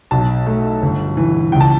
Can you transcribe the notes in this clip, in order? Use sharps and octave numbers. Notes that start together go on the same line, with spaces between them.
B1 A5
A3
G1
E3
C#2 G5
A5